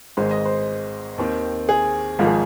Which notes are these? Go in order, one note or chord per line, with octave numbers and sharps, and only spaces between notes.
G#1 G#2 G#3 C5
D#5
C5
D#2 D#3 C4
G#4
G#1 G#2 F3 F4
G#4